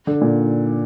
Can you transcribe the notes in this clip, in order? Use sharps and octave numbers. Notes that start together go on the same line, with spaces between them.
D3
A#2